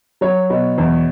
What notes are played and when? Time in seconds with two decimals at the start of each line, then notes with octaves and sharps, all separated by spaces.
0.21 F#3 C#5
0.50 B2
0.78 E2